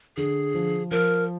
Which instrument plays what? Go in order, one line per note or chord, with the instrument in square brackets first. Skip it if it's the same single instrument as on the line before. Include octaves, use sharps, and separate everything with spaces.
[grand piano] D3 [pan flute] G#4
[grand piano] F3
[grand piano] F3 [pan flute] A#4